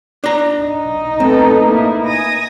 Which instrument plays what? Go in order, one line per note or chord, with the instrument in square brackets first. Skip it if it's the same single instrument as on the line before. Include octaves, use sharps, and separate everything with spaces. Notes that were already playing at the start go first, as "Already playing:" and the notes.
[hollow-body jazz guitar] D4 A#5
[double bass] D#4
[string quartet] A3 B3 A4 [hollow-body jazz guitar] C4
[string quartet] A#3 E4
G#5 D#6 A#6